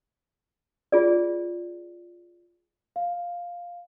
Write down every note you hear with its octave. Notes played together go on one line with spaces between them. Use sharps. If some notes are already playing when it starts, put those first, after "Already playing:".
F4 G#4 D5
F5